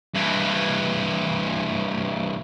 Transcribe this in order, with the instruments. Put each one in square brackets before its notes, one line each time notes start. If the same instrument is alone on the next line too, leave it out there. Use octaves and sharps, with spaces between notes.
[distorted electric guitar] G2 E3